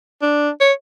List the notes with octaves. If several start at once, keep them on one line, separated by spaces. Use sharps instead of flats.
D4
C#5